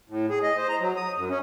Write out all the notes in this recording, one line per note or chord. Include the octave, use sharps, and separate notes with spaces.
A2
G#4
D#5
C5
A#5
F#3
D#6
F#2
C#4